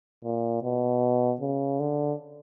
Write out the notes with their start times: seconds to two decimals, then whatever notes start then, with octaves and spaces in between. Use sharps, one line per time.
0.24 A#2
0.63 B2
1.41 C#3
1.80 D3